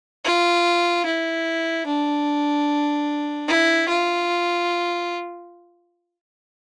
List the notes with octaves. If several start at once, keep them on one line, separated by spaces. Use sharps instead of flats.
F4
E4
D4
E4
F4